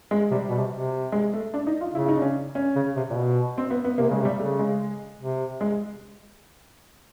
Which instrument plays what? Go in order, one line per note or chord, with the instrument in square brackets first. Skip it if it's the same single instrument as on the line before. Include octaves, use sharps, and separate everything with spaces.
[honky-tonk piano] G#3
[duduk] C3 [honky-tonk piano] G3
[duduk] B2
C3
C3
[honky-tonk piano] G#3
A3
D4
D#4
F4
[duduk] C#3 [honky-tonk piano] E4
[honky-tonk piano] D#4
D4
C#4
C#4
[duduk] C#3
C3
A#2
B2
[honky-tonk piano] C4
B3
B3
[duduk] C3 [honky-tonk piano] A#3
[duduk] C#3 [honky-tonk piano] G#3
[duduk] C3
[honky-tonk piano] G3
[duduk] C#3 [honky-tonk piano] A3
[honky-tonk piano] G#3
[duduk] C3
[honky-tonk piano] G#3